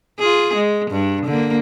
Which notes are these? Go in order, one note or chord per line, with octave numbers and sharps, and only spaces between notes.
F4 G#4
G#3
G2 D4
D3 A#3